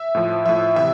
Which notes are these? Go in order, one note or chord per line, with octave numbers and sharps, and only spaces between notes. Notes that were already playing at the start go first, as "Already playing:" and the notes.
Already playing: E5
A2 F3
A2 F3 E5
C3 E3 E5